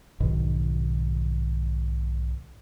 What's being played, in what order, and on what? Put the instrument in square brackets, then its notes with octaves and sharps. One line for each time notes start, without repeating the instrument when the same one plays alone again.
[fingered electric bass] B1 G#2 B2 D#3